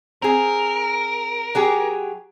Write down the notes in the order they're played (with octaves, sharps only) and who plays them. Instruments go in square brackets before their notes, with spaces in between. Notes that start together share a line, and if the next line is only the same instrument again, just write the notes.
[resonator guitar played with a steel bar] C4 G#4 [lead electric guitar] A#4
[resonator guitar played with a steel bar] F#3 G4 G#4